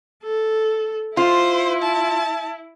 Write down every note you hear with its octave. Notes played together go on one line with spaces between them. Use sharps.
A4
E4 F4 C5
A5